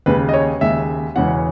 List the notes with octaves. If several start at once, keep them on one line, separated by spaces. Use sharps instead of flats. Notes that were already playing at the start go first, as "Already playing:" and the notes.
D#2 C#3 G#3 B4
D#5
C#5
D#2 C#3 G#3 E5
E1 E2 C#3 G#3 C#4 F#5